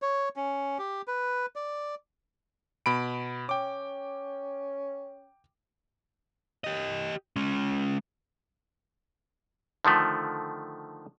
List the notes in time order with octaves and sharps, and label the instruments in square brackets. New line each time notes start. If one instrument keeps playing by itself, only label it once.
[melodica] C#5
C#4
G4
B4
D5
[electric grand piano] B2 B5 D7
[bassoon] C#4 [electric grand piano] G5 D6
[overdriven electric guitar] G4 D#5
G#3 C#4
[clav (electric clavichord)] D3 D#3 F3 A3